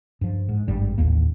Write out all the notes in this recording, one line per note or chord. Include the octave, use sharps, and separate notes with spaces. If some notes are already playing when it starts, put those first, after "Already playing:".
G2 F3
G#2
G#1 G2 G3
D#1 A1 D#2 A#3